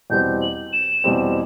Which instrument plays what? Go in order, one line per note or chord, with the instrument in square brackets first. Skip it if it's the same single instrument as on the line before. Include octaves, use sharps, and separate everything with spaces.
[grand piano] E2 B2 G3 C4 [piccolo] G6
[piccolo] F#7
E7
[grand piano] E2 B2 G3 C4